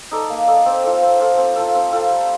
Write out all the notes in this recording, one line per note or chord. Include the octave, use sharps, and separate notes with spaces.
D#4 A4 D5
A#3
D#4 A4 D5
C4
F4 A4
C4
F4 A4
C4
F4 A4
C4
F4 A4
G3